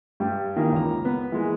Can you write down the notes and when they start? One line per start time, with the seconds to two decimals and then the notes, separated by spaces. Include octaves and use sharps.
0.20 G2 G3
0.56 D#3 E3 A#3
0.72 C#2 A#5
1.05 B3 B4
1.32 E3 G#3 A#3